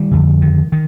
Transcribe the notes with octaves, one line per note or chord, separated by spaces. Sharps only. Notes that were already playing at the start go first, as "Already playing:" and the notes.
Already playing: D#3 G3
F2 D3
D#3
D#3